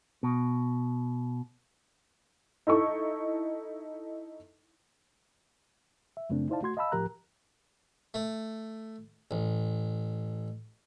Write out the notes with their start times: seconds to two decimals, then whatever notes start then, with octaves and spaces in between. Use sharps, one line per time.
0.23 B2
2.67 D#4 E4 A4 C#6
6.17 E5
6.30 F#2 C#3 A3 C4 D4
6.50 D#4 E4 C5 D5 F5 A5
6.62 A3 F#4 C6 G#6
6.77 D#5 F5 A5 B5 E6
6.92 A2 F3 G4 A#4 A#5 F#6
8.14 A3
9.31 A1